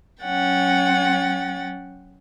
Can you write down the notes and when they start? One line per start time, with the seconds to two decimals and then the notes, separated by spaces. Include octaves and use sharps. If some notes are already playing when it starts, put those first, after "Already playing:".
0.23 F#3 C#4 F#5 G5 A6